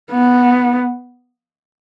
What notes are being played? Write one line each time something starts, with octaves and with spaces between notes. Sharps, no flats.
B3